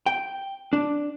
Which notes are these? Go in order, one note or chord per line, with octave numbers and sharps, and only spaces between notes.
G5
D4